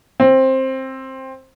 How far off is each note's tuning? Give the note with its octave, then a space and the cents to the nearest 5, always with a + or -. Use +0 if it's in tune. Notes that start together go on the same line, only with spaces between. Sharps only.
C4 +15